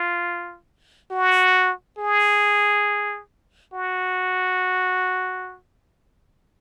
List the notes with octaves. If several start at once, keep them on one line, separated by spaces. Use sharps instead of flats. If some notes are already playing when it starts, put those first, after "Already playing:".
Already playing: F4
F#4
G#4
F#4